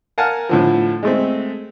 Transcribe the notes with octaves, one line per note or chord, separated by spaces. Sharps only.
A#4 F5 F#5 G#5 A5
A2 D3 F3
G#3 A3 C4